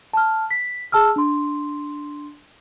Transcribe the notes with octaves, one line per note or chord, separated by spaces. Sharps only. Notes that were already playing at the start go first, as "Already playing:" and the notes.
A5 F6
B6
G#4 A5 E6 F6
D4 C6